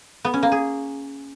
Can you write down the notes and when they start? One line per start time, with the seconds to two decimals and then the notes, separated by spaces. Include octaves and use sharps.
0.25 B3
0.34 C#4
0.43 A#3
0.52 G#4